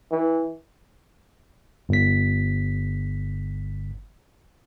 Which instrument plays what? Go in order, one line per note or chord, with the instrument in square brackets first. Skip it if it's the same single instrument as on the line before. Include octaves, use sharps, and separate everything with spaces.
[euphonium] E3
[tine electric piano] G1 B6